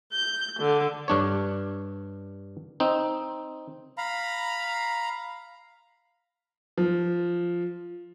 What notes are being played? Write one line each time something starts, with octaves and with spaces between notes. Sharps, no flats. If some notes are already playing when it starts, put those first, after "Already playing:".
G6
D3
G2 D4 C#5
C4 D#4
F5 A#5 B5
F3